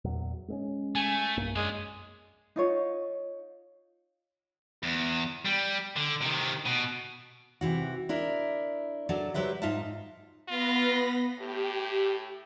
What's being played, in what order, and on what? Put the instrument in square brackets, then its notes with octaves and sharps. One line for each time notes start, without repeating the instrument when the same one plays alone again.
[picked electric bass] E2 A#2 F#3
G#3 C4 C#4
[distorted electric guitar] A3 [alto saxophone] G#5
[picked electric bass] B1 G2 A#3
[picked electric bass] F#2 [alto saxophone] G#3 [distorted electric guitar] D4 G#5
[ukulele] D#4 F4 C#5
[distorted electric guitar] E2
G3
D3
C3 D#3
B2
[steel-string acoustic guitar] C3 E3 F#4
D4 E4 A#4
F#3 D4 A4
F#3 G4 B4 C5 E5
G#2 D#4 F4 E5 A5
[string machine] B3 B5 A#6 [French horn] F4
[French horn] A2 [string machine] G4